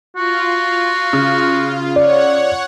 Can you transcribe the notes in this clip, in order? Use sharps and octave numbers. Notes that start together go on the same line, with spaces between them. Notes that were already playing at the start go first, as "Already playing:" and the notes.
F4 F#4
C#3
C#5 D5 F#5